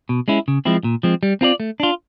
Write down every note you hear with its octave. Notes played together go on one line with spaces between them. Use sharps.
B2
G#3 C#4 E4
C#3
F3 G#3 C4 E4
A#2
F3 G#3 C4
G3
C4 F4 A#4 D5
A3
D4 F4